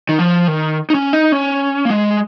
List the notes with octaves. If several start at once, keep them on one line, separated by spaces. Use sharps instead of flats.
D#3
F3
D#3
D#4
C#4
D#4
C#4
A#3
G#3